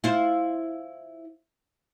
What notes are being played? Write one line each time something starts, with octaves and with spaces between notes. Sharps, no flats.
E4 F4 C5